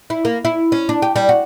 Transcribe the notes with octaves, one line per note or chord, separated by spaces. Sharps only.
E4
A#3
E4
C#4
D4
G4
G3
F#4